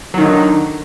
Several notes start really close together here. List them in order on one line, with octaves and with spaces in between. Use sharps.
F#3 D#3 D#4 D3